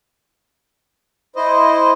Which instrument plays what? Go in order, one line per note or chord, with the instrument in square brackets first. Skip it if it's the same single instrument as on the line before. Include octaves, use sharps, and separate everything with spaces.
[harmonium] E4 C5 D#5